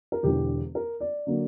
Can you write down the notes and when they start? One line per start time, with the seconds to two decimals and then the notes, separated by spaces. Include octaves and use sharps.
0.12 A#4
0.23 E1 E2 D3 G4
0.75 A#4
1.00 D5
1.27 D3 F#3 A#3